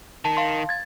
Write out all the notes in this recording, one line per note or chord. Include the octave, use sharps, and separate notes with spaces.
D#3 A5
F5 C6
G#6 A6